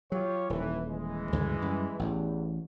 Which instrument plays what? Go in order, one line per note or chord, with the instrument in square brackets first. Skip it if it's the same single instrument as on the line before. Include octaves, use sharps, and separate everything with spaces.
[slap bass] F#3 [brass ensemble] F4 G4 C#5
[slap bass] D#1 [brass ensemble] A2 E3
[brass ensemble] E3 G#3
[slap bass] D2 G2 C#3
F#2 G3
[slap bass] A1 A2 E3 [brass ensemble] E2